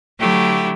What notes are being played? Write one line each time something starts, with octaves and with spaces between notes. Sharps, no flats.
D3 F#3 A3 E4 G4